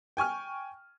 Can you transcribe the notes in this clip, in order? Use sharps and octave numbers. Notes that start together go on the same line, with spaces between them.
G5 G#5 C#6 F6